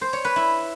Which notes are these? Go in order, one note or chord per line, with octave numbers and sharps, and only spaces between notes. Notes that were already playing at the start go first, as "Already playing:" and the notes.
C5
C#5
B4
E4